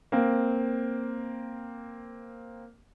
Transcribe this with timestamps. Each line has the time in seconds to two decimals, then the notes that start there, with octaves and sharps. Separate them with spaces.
0.12 A#3 C4